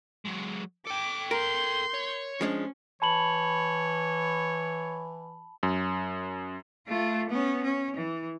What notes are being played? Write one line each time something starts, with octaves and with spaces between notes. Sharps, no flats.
F#3 G#3
A4 G5 D6
A#4 C6 G6
C#5
F3 G#3 C#4 D4
E3 C#5 A5 B5 F#7
F#2
A3 F4
B3 C#4
C#4
E3